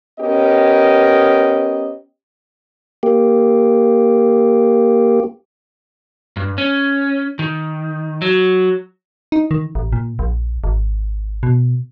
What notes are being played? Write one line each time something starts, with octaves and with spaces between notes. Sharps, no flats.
B3 C#4 G4 A#4 D#5
A#3 G4
G2
C#4
D#3
F#3
D#4
D#3
A1
A#2
A#1
G#1
B2